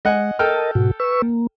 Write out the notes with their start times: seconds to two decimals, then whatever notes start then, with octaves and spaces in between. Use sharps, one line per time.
0.05 G#3 D#5 F#5 G#5
0.39 A4 A#4 D#5 G5 A5 F6
0.75 G#2 B2 F#4
1.00 B4 C#6 E6
1.22 A#3